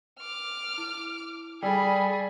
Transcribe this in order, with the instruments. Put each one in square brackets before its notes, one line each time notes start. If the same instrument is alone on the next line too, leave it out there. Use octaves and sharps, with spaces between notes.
[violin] D6 F6
[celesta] E4
[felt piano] G3 [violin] G#4 [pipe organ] A4 B5 [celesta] D5 G5